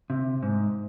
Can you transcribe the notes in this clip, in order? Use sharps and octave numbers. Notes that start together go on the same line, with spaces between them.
C3
G#2